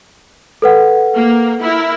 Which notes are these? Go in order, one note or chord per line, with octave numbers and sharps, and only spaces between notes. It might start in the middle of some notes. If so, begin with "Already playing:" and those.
A4 B4 F#5
A#3
E4 A#4